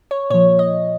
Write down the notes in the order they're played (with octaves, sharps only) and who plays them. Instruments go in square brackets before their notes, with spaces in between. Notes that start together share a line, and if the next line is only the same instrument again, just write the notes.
[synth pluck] C#5
A#2 F3 C#5
D#5